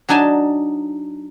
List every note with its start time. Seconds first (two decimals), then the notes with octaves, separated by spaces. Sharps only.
0.09 F#3 D4 D#4 G#5 A5